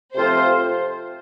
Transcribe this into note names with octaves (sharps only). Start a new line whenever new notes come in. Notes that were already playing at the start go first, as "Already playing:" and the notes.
C3 F3 A3 C4 F4 C5